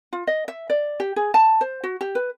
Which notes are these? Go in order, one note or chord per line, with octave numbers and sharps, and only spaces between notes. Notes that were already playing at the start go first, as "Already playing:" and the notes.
F4
D#5
E5
D5
G4
G#4
A5
C5
F#4
G4
B4